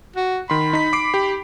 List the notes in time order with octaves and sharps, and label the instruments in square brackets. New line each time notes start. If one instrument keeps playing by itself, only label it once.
[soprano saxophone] F#4
[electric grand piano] D#3 C6 [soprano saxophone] B5
[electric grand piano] D#4 B6
D6 C7 D7
G4